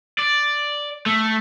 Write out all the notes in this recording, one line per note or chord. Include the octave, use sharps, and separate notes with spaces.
D5
A3